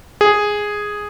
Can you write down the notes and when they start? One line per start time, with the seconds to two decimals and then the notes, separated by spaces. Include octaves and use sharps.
0.21 G#4